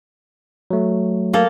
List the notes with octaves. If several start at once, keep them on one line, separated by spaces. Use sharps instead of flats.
F#3 A3
A#3 A4